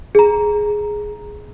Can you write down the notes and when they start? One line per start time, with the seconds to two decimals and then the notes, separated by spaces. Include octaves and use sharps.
0.15 G#4 A#5